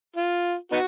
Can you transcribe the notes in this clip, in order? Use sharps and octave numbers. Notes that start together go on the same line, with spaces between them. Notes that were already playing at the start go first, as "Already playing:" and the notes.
F4
B3 D#4 F#4